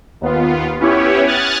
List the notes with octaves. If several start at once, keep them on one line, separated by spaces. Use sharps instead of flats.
D#2 B3 F4
B3 C#4 E4 G4 C#5
D#6 F6 F#6 G#6 A6